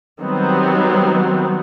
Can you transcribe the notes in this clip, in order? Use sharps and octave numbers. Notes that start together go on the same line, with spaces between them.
D#3 F#3 G3 B3 C4